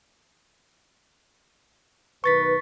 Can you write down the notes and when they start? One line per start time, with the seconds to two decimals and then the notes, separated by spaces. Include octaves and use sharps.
2.24 B1 D#3 B4 C#6 A6 B6